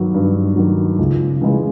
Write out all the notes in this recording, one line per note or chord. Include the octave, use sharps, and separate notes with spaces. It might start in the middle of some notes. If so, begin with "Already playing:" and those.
Already playing: G2 D#3 F#3
G2
D#3 F#3
C#2
C#3 E3 G#3